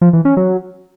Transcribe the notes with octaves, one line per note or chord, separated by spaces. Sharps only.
F3
E3
C#4
F#3